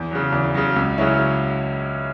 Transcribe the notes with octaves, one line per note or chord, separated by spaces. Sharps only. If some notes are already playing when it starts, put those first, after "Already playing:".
Already playing: E2
C#3 F#3
E2
C#3 F#3
C#2
C#3 F#3 C#4 E4